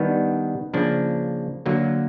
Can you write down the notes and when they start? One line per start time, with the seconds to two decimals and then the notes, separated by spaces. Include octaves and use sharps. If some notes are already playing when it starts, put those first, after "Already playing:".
Already playing: D#3 G3 B3 D4
0.74 C#3 F3 A#3 D4
1.66 D3 F#3 A#3